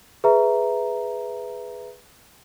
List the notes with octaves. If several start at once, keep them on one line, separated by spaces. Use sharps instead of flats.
G#4 B4 E5 A#5